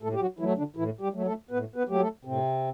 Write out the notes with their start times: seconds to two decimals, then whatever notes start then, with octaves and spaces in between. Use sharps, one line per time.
0.02 A2 A3 A4
0.14 G4
0.20 F#3 F#4
0.39 E3 F#3 A3 E4
0.57 D3 D4
0.76 A2 E3 E4
1.01 G3 G4
1.14 F#3 A3
1.26 A3 A4
1.51 A2 B3 B4
1.76 B3 B4
1.89 F#3 A3 G4
2.00 A3 A4
2.25 A2 C3 C4